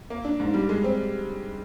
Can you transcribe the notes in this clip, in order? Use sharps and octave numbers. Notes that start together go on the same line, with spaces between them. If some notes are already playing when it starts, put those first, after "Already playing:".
A#3
D4
G#2
G3
G#3
C4